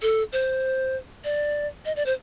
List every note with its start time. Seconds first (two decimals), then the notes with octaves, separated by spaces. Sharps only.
0.02 A4
0.32 C5
1.24 D5
1.85 D#5
1.96 D5
2.06 C5